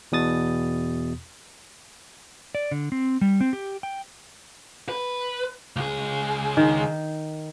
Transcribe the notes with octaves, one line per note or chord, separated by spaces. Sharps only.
E2 B2 D#6 A6
D5
D3
C4
G3
C4
G4
G5
B4
C#2 G#4
D#3